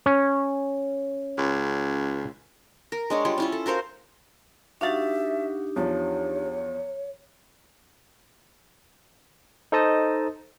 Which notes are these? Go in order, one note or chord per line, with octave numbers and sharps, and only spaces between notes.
C#4
C#2
A#4
G#3 D4 C#5
G3 F4 C#5
C#4 E4 F4
A4
F#4 A#4 C5 F5
D4 D#4 F#4 G4 E5 F5 A6
E2 F3 C#5
D#4 A4 C5 D#5 A5 D#6